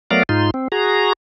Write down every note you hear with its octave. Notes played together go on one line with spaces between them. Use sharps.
F#3 A3 B3 A#4 D5 F5
G#2 D#4 F4 C6
C4
F#4 G#4 A#5